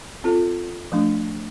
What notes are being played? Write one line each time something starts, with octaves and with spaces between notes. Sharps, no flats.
C4 F4 A4
F3 A3 D4